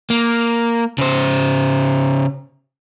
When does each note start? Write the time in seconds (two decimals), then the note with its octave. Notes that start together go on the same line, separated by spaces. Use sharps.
0.10 A#3
0.98 C#3 C5